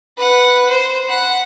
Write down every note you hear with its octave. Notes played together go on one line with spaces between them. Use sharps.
B4 F#5
C5
F#5 B5